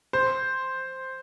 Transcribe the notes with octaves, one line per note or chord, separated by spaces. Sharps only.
C5